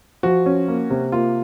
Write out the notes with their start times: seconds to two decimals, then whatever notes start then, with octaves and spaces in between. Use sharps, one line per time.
0.23 F3 F#4
0.46 C#4
0.68 A#3
0.90 C3
1.12 A#3 F4